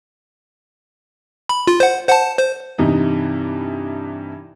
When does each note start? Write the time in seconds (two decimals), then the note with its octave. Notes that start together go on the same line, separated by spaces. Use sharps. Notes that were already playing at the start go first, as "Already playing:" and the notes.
1.49 B5
1.67 F4
1.80 C5 F#5
2.08 C5 F#5 A5
2.38 C5
2.78 G2 C3 E3 D#4